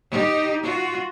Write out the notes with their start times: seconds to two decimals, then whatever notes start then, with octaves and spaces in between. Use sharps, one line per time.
0.11 D#4 G4
0.63 F4 F#4